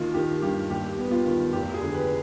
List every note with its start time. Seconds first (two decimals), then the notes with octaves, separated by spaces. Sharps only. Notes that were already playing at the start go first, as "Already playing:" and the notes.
Already playing: D#2 D#3 F4
0.14 D#3 G4
0.42 G2 G4
0.70 D#2 G4
0.98 B3
1.11 F4
1.26 D#3
1.53 F1 G4
1.74 G#4
1.81 D3
1.94 B4